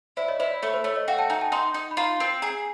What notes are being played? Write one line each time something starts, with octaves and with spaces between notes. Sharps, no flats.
E4 C5 D5
C#5 D#5
E4 C5 D5
C#5
A3 C#5
C5
A3 C#5
C#5 D#5
F#4 F5 G5
G5 A5
D#4 G#5 A#5
G5 A5
D#4 A#5 C6
D#4
B5
F4 A#5 C6
C4
G#4 G#5 A#5